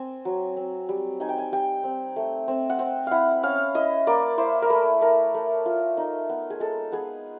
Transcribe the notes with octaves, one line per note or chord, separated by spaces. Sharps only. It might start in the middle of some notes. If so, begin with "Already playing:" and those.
Already playing: C4 G#5
F#3
C4
G3
D#4 G#5
G5
G#5
G3 G5
C4
A3
C4
F#5
C4 G5
E4 F5 F#5
C#4 F5
E4 D#5
A#3 D5
E4 C5
A#4
A3 B4
A3 A#4
A3
F4
D#4
B3
G#4
G#3 A4
B3 G#4